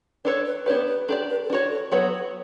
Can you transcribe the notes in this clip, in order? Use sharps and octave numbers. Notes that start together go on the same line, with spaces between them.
D4 A4 B4 C#5
B4
B3 D4 G4 B4 C#5
B4
D4 G4 A4 D5
B4
A4
D4 F#4 B4 C#5
A4
F#3 B3 F#4 B4 C#5
C#5